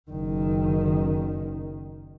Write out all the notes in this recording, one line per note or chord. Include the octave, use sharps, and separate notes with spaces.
F#1 D#3